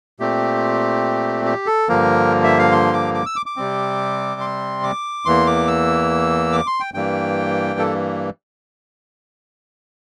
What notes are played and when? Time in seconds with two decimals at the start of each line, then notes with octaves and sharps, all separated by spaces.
0.20 A#2 A3 C4 G4
1.45 G4
1.66 A4
1.89 G2 D3 F3 A#3 A#4
2.44 E5
2.59 F5
2.72 C6
2.93 D6
3.14 D6
3.26 E6
3.36 D6
3.46 D6
3.56 C3 G3 C4
4.41 C6
4.83 D6
5.25 E2 E3 A#3 C6
5.47 D6
5.67 E6
6.52 D6
6.67 C6
6.80 G5
6.94 G2 E3 G3 A#3 G5
7.79 A4